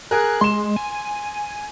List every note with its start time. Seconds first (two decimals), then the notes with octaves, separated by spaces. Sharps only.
0.11 G#4 A#4 F#6
0.41 G#3 C6 E7
0.76 G#5